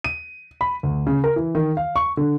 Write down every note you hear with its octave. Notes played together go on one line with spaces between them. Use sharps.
D#7
B5
D2
C#3
A#4
E3
D#3
F5
C#6
D3